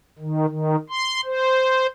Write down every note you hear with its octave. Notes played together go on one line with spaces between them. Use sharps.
D#3
D#3
C6
C5